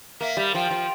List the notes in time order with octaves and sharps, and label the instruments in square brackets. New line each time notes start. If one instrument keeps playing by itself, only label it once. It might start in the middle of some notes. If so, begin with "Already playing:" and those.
[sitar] A#3 [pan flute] E5
[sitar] G3
[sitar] F3 [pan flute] G5
[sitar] F3